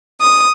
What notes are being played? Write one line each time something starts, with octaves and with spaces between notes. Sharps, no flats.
D#6